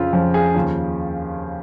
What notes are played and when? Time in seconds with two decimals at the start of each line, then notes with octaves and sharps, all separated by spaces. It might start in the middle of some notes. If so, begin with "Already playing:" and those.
Already playing: F2 C#3 F3 F4
0.13 F2 C#3 F3
0.34 G#4
0.55 D#2 C#3 F3